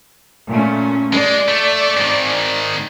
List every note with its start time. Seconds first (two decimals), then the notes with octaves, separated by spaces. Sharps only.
0.48 A#2 A3 C#4
1.13 G#3 D5
1.48 A3
1.97 G#2 D#3